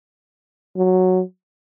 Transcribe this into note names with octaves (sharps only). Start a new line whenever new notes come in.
F#3